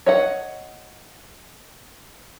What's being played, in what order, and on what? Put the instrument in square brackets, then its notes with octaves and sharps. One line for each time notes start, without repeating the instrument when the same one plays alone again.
[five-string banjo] C#5 D#5 F#5